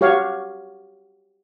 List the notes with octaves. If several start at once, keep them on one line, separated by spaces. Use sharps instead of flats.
F#4 G4 C#5 F5